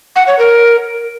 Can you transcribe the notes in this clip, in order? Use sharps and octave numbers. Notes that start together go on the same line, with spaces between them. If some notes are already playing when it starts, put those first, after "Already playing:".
F#5
C#5
A#4